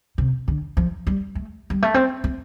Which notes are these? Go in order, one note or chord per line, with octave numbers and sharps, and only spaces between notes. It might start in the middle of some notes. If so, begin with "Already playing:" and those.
C3
D3
F3
G3
A3
G3
A3
C4
C4